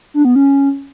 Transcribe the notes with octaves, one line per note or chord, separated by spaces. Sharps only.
D4
B3
C#4